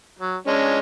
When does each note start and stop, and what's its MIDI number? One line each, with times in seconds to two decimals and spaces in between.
0.19 0.37 54
0.47 0.79 56
0.47 0.79 61
0.47 0.79 62